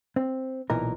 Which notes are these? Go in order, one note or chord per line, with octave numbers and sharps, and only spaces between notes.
C4
B1 A#2 E3 D#4 A#4